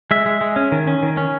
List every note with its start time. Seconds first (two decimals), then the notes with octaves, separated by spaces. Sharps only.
0.11 G#3 E5
0.26 G#3
0.41 G#3
0.56 C#4
0.72 D#3
0.87 C#4
1.03 D#3
1.17 C#4